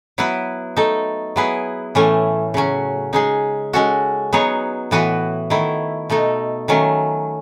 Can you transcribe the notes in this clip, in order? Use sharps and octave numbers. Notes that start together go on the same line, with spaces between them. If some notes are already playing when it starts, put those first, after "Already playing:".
F#3 B3 E4 B4
A3 D#4 A4
F#3 B3 E4 G#4 B4
A2 E3 A3 C#4
C#3 F#3 C#4
C#3 G#3 D#4 G#4
G#3 C#4 F#4 A4
F#3 B3 D#4 G#4 C#5
A2 E3 B3 F#4 B4
D#3 A3 E4
B2 A3 D#4 A4
D#3 F#3 A3 C#4